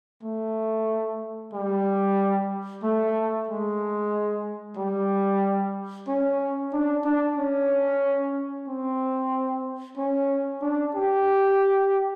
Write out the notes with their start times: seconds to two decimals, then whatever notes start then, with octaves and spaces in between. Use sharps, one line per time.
0.23 A3
1.53 G3
2.83 A3
3.48 G#3
4.77 G3
6.07 C#4
6.73 D4
7.04 D4
7.37 C#4
8.68 C4
9.97 C#4
10.62 D4
10.95 G4